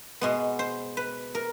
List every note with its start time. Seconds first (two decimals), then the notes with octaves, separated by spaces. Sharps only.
0.21 B2 G#3 B3
0.59 C5
0.97 B4
1.35 A#4